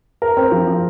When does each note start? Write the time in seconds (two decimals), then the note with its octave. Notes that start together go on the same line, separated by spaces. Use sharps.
0.22 A#4
0.37 C4
0.52 F3
0.67 F3